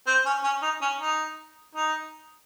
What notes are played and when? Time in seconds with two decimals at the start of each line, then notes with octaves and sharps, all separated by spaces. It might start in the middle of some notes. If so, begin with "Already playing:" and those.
0.07 C4
0.26 C#4
0.44 C#4
0.63 D#4
0.82 C#4
1.00 D#4
1.76 D#4